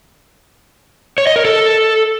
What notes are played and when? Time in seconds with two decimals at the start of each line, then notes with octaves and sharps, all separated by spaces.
1.18 C#5
1.27 D#5
1.36 A#4
1.45 A4